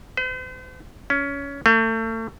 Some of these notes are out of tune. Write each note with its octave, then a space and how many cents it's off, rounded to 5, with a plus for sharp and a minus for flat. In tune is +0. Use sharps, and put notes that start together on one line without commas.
C5 -45
C#4 +20
A3 +35